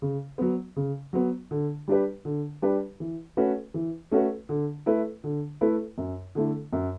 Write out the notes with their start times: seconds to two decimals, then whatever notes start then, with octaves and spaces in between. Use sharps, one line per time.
0.02 C#3
0.38 F#3 B3
0.76 C#3
1.13 F#3 B3
1.51 D3
1.88 G3 D4 G4 B4
2.25 D3
2.62 G3 D4 G4 B4
3.00 E3
3.37 A3 C#4 F#4 B4
3.74 E3
4.11 A3 C#4 F#4 B4
4.49 D3
4.86 A3 E4 B4
5.24 D3
5.61 A3 E4 B4
5.98 F#2
6.35 D3 A3 E4
6.73 F#2